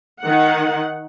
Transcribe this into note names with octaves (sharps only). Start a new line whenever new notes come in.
D#3 F#5